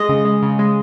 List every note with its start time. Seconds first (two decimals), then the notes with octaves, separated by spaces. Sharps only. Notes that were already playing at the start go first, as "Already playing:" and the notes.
Already playing: G#3 D#5
0.09 C#3
0.25 G#3
0.42 C#3
0.59 G#3